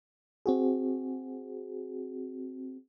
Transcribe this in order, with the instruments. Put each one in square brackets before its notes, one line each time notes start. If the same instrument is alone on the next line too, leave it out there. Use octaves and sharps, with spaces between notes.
[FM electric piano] C4 F#4 G#4